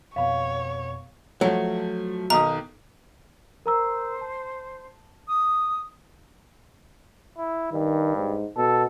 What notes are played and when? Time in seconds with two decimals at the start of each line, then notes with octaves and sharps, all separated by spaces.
0.16 F2 B2 B3 C#5 F5 B5
1.41 F3 F#3 A3
2.30 B1 D#3 A#5 D#6
3.66 A#4 C5 A#5 E6
4.21 A5
5.28 D#6
7.38 E4
7.72 G2 D#3
8.16 G#2
8.57 B2 A4